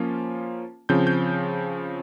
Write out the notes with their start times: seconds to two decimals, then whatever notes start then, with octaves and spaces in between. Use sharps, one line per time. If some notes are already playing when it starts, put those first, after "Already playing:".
Already playing: F3 A#3 C#4 F4
0.89 C#3 F3 C4 G6
1.07 G6